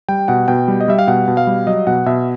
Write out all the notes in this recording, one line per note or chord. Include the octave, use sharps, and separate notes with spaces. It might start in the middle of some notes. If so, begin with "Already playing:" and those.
G3 G5
B2 F#5
B2 G5
G3
D#5
G3 E5
F5
B2 F#5
B2
F5
G3
F#3 D#5
B2 F#5
B2 E5